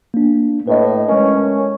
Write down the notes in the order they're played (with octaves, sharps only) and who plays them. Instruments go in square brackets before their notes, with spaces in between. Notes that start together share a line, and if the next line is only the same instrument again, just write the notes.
[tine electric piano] A#3 D4
[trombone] A2 [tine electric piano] B4 D#5
[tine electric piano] G#3 A#4 [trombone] C#4